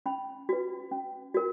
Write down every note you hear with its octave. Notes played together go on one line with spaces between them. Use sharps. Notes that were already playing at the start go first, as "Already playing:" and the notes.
C#4 B5
F#4 B4
C#4
F#4 A#4